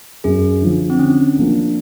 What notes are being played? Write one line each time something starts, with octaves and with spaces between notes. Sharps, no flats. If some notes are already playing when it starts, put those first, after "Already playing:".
F#2 G#4
D3 F3
C4
D3 C#4
F3 A#3 D4